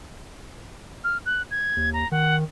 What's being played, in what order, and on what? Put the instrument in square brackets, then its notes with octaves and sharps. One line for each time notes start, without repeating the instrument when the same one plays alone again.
[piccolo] F6
F#6
G#6
[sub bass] D#2
[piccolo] A#5
[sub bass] D#3 [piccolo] F#5